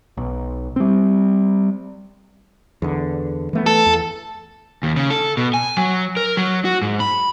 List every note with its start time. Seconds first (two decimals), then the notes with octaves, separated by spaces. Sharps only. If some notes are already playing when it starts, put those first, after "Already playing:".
0.17 B1
0.76 G3 C4
2.82 E2 D3
3.53 E3 A3 B3
3.66 A4
3.86 E2
4.83 D#2
4.96 C#3
5.10 A4
5.37 B2
5.54 G#5
5.77 F#3
6.17 A#4
6.37 F#3
6.65 F#4
6.81 G#2
7.00 B5